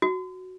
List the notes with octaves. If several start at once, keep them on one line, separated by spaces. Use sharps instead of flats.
F#4